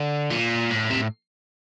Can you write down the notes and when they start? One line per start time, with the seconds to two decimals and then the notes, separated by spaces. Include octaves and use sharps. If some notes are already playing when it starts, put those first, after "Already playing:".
Already playing: D3
0.30 A#2
0.71 A2
0.91 C3